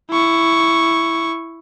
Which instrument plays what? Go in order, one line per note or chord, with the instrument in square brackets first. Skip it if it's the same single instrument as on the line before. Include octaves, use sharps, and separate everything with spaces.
[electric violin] E4 C#6